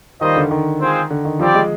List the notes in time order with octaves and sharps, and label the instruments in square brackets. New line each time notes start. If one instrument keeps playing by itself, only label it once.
[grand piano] D#3 [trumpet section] G3 A#3 F4 C5 D#5
[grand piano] D3
D#3
[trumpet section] G#3 C4 F4 G#4 C5
[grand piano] D3
D#3
[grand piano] F3 [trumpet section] G3 C4 G4 D5 G5
[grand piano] G#3